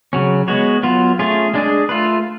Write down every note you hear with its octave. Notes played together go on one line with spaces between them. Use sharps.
C#3 F#3 C#4
G#3 B3 F#4 C#5
F#3 B3 F4
A3 C#4 F4 G#4
G#3 D4 G#4
A3 F4 B4